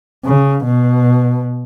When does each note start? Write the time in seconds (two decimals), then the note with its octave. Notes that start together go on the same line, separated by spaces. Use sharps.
0.25 C#3
0.65 B2